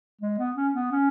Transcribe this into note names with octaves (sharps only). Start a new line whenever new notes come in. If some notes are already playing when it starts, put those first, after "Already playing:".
G#3
B3
C#4
B3
C#4